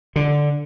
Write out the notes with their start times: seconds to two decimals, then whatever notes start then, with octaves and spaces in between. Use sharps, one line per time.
0.16 D3